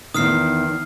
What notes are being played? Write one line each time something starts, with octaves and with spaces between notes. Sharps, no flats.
E2 D#3 D#6 F6 C7